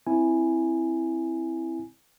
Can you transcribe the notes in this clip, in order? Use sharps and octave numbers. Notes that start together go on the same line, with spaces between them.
C4 E4 G#5